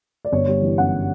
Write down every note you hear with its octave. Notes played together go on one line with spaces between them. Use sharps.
D5
G1 C#5
G3
E3
F#2 F#5